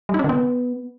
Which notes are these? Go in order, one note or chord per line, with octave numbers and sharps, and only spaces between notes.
G3
D#4
C#4
D3
B3